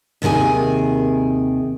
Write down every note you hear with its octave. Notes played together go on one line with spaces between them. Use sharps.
D#2 C3 D#3 G#4 G#5